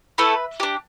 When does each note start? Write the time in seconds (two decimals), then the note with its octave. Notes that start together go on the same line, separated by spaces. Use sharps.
0.18 A3 E4 A4 B4
0.60 D4 G4